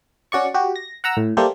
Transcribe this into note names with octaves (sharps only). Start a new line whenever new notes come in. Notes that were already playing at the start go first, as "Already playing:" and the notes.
C#4 F#4 D5 C#6
F#4 G4
A#6
F#5 A#5 E6
A2
G3 A3 A#3 G4 A4 C5